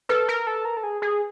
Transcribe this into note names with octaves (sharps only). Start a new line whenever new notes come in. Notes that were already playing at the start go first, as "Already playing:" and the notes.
A4 B4
A#4
A4
A#4
A4
G#4
G#4